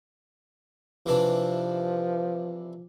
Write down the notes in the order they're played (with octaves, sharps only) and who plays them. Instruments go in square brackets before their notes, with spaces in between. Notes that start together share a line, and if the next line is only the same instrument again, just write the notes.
[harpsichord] C3 E3 D4 [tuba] F3